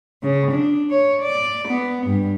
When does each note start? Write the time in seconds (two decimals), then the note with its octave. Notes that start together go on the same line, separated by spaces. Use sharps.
0.22 C#3
0.51 D4
0.90 C#5
1.19 D5
1.67 B3
2.06 G2